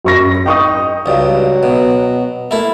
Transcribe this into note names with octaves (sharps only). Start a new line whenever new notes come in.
F#2 C#6 A#6
D#4 G5 C#6 D#6
C#2 G2 F#3
B2
A3 A#3 E4